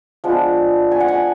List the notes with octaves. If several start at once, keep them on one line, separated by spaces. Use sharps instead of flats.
F3 G#3 B3 D4 F#5
G#5
F#5
G#5